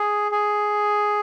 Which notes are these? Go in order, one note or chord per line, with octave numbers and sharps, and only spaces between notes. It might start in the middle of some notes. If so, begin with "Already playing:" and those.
Already playing: G#4
G#4